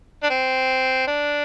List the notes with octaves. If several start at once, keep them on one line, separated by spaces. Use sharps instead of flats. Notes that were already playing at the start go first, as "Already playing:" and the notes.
D4
C4
D4